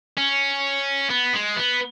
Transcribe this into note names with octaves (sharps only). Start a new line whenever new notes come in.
C#4
B3
G#3
B3